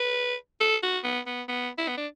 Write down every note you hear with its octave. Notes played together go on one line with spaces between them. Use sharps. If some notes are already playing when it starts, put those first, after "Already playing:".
Already playing: B4
A4
F#4
B3
B3
B3
E4
B3
D4